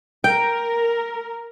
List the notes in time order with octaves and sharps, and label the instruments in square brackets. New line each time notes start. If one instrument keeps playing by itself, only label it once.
[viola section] A#4 [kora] G5